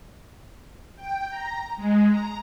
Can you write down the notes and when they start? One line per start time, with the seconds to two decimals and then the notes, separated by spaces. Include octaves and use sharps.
0.96 G5
1.29 A#5
1.77 G#3
2.10 A#5